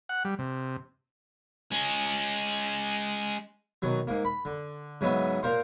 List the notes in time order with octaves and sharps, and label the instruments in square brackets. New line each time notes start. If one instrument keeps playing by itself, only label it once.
[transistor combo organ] F#5
G3
C3
[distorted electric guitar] G#3 C#4
[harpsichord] B2 D#3 F#3
G#2 A#3
B5
D3
G#2 C#3 F#3 B3 D#5 E5
A#2 A#4 C5 F5 C6